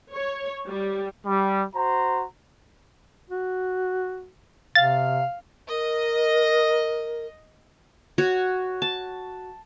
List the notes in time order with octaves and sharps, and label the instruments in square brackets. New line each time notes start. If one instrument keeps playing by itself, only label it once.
[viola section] C#5
G3
[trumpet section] G3
F#4 C5 A#5
[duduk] F#4
[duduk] C3 [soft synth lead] F5 [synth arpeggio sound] A6
[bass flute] A#4 [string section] D#5
[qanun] F#4 C#5
A5